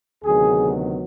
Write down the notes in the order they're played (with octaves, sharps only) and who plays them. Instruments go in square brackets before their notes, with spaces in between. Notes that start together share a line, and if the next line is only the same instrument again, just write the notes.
[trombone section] D2 C3 D#3 F#3 B3 G#4